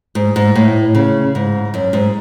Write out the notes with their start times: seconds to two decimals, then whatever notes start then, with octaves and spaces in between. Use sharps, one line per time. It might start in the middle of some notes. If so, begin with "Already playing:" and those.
0.15 G#2
0.36 G#2
0.55 A2
0.95 C#3
1.35 G#2
1.74 F#2
1.93 G#2